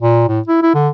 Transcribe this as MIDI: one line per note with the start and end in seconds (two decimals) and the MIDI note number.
0.02 0.24 46
0.28 0.40 45
0.48 0.60 64
0.63 0.73 64
0.75 0.89 50